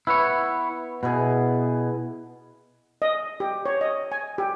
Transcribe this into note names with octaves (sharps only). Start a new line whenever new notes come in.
B3 E4 B4 C#5
B2 B3 E4 G#4
D#5
G4
C#5
D#5
G#5
G4